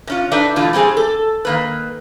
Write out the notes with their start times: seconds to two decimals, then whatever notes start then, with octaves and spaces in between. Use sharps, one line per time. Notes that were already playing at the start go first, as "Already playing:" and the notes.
0.07 C3 C#4 F4
0.31 D4 D#4 A4 B4 E5
0.56 B2 D3 E3 A3 F4
0.73 G3 G#3 C4 G#4
0.97 A4
1.45 D#3 A#3 B4